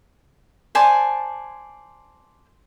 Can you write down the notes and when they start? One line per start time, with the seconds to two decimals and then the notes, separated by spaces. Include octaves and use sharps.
0.75 C5 D5 G#5 A5